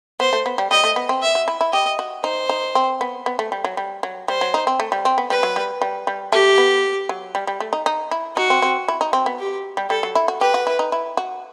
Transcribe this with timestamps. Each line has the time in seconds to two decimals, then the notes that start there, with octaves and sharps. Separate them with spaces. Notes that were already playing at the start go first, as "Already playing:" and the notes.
0.20 B3 C5
0.33 A3
0.46 B3
0.58 G3
0.71 G3 D#5
0.84 A3
0.96 B3
1.09 C4
1.22 E5
1.35 F#4
1.48 E4
1.61 E4
1.73 G4 D#5
1.99 F#4
2.24 D#4 C5
2.49 D#4
2.75 C4
3.01 B3
3.26 B3
3.39 A3
3.52 G3
3.64 F#3
3.77 G3
4.03 F#3
4.28 G3 C5
4.41 F#3
4.54 D#4
4.67 C4
4.80 A3
4.92 G3
5.05 C4
5.18 B3
5.30 G3 B4
5.43 F#3
5.56 G3
5.81 G3
6.07 G3
6.32 A3 G4
6.58 B3
7.09 F#3
7.35 G3
7.47 G3
7.60 A3
7.73 D#4
7.86 D#4
8.11 E4
8.36 D#4 F#4
8.50 C4
8.62 C4
8.88 E4
9.01 D#4
9.13 C4
9.26 B3
9.39 G4
9.77 G3
9.90 G3 A4
10.03 F#3
10.15 E4
10.28 F#4
10.41 G4 B4
10.54 F#4
10.67 E4
10.79 D#4
10.92 E4
11.17 F#4